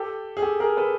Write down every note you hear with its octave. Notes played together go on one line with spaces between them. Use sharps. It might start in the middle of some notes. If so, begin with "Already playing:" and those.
Already playing: G4 A4
G#4
G4 A4
G#4 A#4
A4 B4